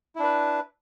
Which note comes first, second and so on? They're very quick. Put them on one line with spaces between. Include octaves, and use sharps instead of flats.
E4 D4 B4